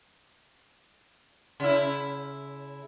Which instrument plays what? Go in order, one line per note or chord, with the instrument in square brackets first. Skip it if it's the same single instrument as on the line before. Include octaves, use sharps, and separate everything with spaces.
[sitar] C#3 E4